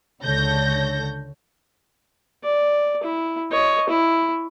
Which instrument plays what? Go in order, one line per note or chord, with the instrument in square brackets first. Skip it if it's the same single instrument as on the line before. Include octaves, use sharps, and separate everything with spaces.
[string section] C#2 D3 A4 C#5 G6 A#6
[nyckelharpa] D5
E4
C#5 D#5
E4